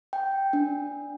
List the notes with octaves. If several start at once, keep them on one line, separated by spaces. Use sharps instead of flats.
G5
D4